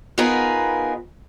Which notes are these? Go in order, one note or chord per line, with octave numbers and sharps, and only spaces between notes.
B3 D#4 F4 G#4 A#4 B4